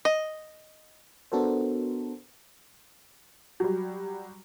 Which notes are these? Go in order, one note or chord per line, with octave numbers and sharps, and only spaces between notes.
D#5
B3 D4 F#4 A4 A#4 C5
F#3 G3